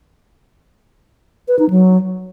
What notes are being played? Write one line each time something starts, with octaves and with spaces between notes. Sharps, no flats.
B4
D#4
F#3